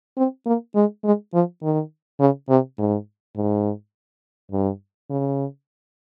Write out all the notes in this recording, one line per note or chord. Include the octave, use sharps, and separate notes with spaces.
C4
A#3
G#3
G#3
F3
D#3
C#3
C3
G#2
G#2
G2
C#3